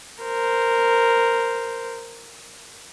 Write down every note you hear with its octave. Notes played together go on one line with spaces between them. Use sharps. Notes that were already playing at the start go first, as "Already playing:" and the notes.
A#4 C5